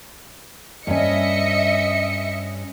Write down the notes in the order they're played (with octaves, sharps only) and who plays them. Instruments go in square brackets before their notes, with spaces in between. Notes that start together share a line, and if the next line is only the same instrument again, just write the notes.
[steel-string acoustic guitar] G2 C#4 [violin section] D#5 E5 C#7